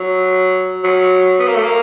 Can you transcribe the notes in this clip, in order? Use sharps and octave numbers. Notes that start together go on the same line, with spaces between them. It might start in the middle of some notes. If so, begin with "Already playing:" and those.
Already playing: F#3
F#3
B3
A#3
A3
A#3